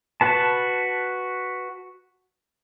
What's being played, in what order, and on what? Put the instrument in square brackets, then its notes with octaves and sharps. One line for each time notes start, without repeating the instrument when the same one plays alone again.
[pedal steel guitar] F#4 B4 A5